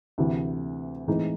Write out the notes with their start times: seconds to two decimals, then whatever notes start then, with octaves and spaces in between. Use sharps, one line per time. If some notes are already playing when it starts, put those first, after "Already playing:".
0.18 D2 C3 E3
1.07 A2 E3 G#3 C4 D#4